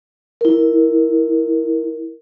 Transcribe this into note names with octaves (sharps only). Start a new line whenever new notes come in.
E4 A#4